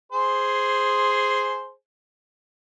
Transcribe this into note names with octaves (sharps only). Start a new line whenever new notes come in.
G#4 C5